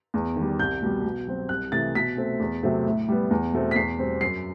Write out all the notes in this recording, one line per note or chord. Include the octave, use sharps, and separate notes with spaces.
E2
D#3
G3
C2 G6
B2 G3
B2
F#3 C4
C2 F#6
C3 E3 A3 C4 A6
B2 B6
A3 C4
E2
C3 F#3 A3 C4
A2
G3 B3
E2
B2 A3 C4
B6
E2 C7
B2 G3 C4
F#2 C7